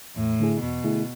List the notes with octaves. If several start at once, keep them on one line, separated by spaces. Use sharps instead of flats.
E2 A2
D3 A3 E4 G#4
E2 B2
D3 A3 E4 G#4